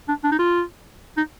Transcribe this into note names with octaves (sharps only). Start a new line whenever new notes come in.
D4
D4
D#4
F4
D#4